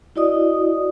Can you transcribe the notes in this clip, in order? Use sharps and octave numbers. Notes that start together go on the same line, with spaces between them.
E4 F#4 D5 D#5 D#6